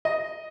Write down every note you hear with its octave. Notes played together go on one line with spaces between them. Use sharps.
D#5